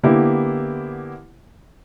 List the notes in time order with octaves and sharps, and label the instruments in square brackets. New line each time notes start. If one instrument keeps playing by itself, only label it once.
[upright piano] D3 A#3 B3 E4 G4